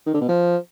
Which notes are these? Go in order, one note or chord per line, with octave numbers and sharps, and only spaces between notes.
D#3
D3
B2
F3